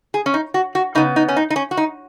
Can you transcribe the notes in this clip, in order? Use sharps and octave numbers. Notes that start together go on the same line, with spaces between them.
G#4
C#4
D#4
F#4
F#4
C#3 B3 D#4
D#4
C#4
D#4
D#4
C#4
F#4
D#4